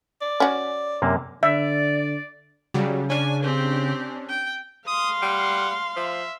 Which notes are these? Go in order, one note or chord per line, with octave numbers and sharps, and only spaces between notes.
D5
C#4 F#4
F#2 C3 A#3
D3 D5 E5
C#3 F#3 G3
C#4 D4 G#5
C4 G4
G5
F5 C6 D#6
G3 F#5
F3 E5